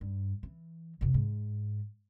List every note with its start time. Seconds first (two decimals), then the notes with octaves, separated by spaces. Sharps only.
0.01 G2
0.43 E3
1.01 F2 C3
1.14 G#2